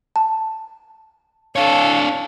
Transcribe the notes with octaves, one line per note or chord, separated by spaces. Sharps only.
A5
D4 A4 C#5 F5